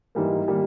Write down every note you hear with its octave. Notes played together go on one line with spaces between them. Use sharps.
G#2 E3 G3 A#3
D#3 G3 A#3